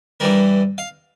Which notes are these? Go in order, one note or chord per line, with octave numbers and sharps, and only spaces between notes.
G2 E3 G3 A#4
F5